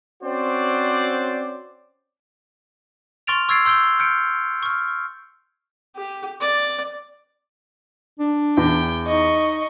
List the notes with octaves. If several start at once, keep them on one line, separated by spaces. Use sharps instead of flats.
C4 C#4 F#4 C5 D5
C6 C#6 F6 A6 D7 F7
C#6 E6 G#6 A6 C7 D7
C6 E6 G6 D7 G7
F6 G6 C#7 D7
C#6 F6
G4
D5
D4
E2 G5
D#4 D#5 C#6